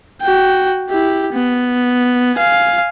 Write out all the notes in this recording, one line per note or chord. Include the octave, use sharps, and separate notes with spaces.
F#4 G5
E4 G4
B3
F5 G#5